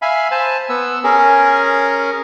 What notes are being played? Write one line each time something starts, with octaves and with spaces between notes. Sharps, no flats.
E5 F5 G#5 B5
C5 G#5 A5
B3 E6
C#4 G#4 A#4